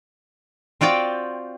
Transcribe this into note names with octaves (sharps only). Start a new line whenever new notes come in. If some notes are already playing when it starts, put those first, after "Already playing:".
C4 F4 F#4 D5 G5